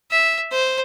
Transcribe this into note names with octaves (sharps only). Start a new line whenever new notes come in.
E5
C5